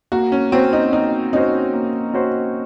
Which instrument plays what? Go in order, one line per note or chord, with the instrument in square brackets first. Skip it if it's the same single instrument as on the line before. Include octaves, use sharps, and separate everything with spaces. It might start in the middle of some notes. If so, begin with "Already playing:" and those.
[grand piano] A#3 [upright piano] F#4
[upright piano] C#4
[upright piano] C4 [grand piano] C#4 F#4 C5
[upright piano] D#4
[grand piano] A#3 [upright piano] D#4
[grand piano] C#4 F#4 C5 [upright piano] D#4
[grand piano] A#3
C#4 F#4 C5